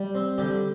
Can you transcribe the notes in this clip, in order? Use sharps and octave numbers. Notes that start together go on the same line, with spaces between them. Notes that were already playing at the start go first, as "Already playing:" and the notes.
Already playing: G3
C4
D3 G3 G4